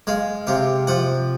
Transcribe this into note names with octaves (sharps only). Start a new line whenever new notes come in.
G#3 F5
C3 F5
F3 F#5